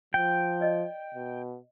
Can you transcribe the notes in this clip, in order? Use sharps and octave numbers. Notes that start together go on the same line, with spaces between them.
F3 G5
D5 D#5
B2